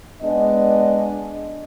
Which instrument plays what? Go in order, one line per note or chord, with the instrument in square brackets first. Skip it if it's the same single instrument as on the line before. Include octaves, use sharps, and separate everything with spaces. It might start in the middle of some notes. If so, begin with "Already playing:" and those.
[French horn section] G#3 B3 D4 D5 D#5